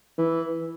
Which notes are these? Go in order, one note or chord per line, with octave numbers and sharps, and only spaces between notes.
E3